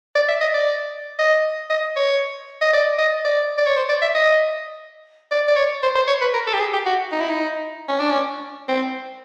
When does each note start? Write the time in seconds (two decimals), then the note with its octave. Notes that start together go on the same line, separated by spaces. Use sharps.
0.15 D5
0.28 E5
0.41 D#5
0.54 D5
1.19 D#5
1.70 D#5
1.96 C#5
2.61 D#5
2.73 D5
2.98 D#5
3.25 D5
3.58 D5
3.67 C#5
3.77 C5
3.89 D5
4.02 E5
4.15 D#5
5.31 D5
5.48 D5
5.57 C#5
5.83 C5
5.95 C5
6.08 C#5
6.21 B4
6.34 A#4
6.47 A4
6.54 G4
6.60 G#4
6.73 G4
6.86 F#4
7.12 D#4
7.20 E4
7.29 D#4
7.89 C#4
7.99 D4
8.10 C#4
8.68 C4